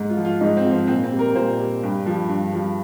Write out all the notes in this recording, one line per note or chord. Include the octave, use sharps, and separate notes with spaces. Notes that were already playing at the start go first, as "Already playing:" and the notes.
Already playing: G#2
F4
F3
F4
G#2 D#4
C4
F3
C4
A#2 C4
C4
G3
A#4
A#2 C5
G3
G2
F3
G2
F3